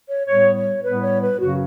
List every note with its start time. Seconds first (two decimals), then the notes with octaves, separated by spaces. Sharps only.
0.08 C#5
0.27 A2 G3 B3 C#5
0.55 C#5
0.83 A2 G3 B3 B4
1.02 C#5
1.22 B4
1.39 F#2 C#3 F#3 F#4